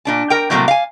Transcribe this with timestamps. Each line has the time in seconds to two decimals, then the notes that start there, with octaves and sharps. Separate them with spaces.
0.05 A#2 D4 A5
0.30 A#4 G5
0.50 A2 C3 F#3 G3 A3 A#3
0.68 F5 G#5